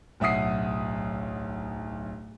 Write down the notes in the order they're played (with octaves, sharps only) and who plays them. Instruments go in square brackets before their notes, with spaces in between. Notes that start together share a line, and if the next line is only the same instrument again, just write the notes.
[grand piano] D1 B1 E5 F#5 D#6 C7